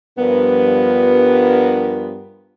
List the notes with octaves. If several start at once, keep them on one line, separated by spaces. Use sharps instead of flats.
G2 F3 B3 A#4